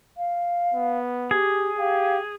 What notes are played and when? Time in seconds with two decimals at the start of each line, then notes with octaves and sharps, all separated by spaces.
0.17 F5
0.74 B3
1.31 G4 G#4
1.78 G4 F5